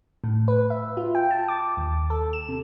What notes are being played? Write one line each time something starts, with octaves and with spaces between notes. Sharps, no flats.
A2
B4
E5
F4
G5
A5
D6
D#2
A4
E7
C3